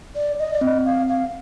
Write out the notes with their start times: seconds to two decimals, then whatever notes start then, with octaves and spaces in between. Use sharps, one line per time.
0.16 D5
0.39 D#5
0.53 D5
0.61 C4 D#5
0.86 C4 F5
1.08 F5